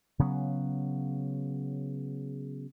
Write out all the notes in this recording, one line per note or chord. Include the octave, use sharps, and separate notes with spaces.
C#3 F#3 B3